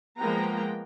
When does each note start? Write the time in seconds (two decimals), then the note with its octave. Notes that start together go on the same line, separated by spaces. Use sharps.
0.18 F3 G#3 A#3 B3 G5 A#5